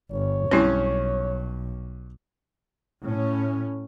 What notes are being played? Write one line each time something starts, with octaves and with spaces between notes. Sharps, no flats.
G1 C#5
B1 G2 C4 C#4 E4
A2 C#4